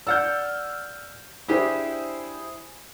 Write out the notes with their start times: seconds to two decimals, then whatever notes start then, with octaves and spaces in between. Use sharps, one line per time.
0.07 D5 F#5 E6 F6 G6
1.48 D4 E4 G4 G#4 C5